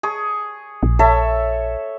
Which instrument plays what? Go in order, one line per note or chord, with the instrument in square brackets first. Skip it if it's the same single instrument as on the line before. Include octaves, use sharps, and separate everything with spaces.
[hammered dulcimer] G#4 C#6
[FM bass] A#1
[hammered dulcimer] A4 C#5 E5